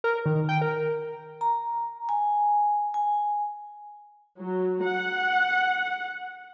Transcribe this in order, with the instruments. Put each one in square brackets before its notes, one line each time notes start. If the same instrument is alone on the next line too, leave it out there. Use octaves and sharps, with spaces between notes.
[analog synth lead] A#4
D#3
G5
A#4
[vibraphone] A#5
G#5
G#5
[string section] F#3
F#5